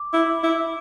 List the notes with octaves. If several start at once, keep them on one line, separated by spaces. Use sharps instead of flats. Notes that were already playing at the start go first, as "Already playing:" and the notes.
Already playing: D6
E4
E4